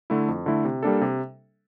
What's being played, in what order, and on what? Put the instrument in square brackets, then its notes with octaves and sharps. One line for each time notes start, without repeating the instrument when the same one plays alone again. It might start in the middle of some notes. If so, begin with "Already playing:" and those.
[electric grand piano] D3 A3 E4
F2
D3 A3 E4
C3
G3 A#3 D4 A4
C3